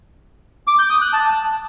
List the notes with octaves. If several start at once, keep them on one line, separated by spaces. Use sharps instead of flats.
D6
G6
D#6
F#6
A5